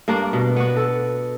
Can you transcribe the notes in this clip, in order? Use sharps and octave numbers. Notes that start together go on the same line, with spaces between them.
G2 A#3 D4 A#4
B2
B3 D4 F#4
A4